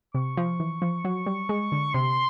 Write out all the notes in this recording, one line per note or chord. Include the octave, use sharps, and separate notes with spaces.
C3 C#6
F3
E3
F3
F#3
G3
G#3
D3
C3 C6